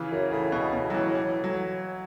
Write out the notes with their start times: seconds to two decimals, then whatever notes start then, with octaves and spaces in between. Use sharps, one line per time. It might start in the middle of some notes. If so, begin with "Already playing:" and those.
Already playing: C#3 E3
0.11 F#2
0.31 A2 C#3
0.52 B2
0.73 B2
0.90 F#3
0.94 E3
1.15 E3
1.44 F#3